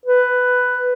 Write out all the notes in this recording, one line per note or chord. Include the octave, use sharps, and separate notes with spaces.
B4